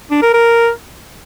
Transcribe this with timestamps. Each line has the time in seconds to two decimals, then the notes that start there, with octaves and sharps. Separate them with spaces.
0.11 D4
0.22 A#4
0.34 A#4